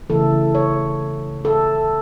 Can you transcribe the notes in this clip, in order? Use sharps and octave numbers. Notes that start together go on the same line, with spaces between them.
C#3 E3 A3 A4
C#5
A4